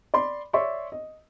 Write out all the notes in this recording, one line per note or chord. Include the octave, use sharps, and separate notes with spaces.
D5 B5 C6
C#5 D5 E5 C6 C#6
D#5